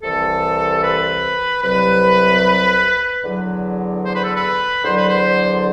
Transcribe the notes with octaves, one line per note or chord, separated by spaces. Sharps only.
C2 C3 E3 A4
B4
C2 C3 F#3 B4
E2 D3 F#3
C5
B4
A4
B4
E2 D3 F#3 C5
B4
C5